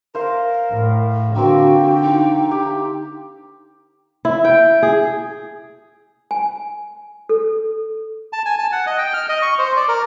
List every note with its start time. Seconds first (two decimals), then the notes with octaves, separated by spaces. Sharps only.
0.15 A#4 C5 F5
0.72 A2
1.36 D3 A#3 C4 F#4 G5
2.03 D#4
2.51 G4
4.25 E4
4.45 G5
4.83 G#4
6.31 G#5
7.29 A4
8.33 A5
8.45 G#5
8.59 A5
8.72 F#5
8.87 D#5
8.98 G5
9.14 F6
9.29 D#5
9.42 C#6
9.59 C5
9.76 D5
9.88 A#4